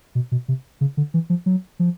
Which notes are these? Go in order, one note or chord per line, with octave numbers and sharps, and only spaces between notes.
B2
B2
C3
C#3
D3
E3
F3
F#3
F3